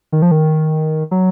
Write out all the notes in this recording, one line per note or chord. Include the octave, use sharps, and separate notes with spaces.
D#3
F3
D#3
F#3